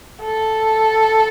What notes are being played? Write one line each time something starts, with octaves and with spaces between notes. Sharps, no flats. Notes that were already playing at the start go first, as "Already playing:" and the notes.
A4